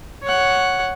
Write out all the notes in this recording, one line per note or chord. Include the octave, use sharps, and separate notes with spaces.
C#5 F#5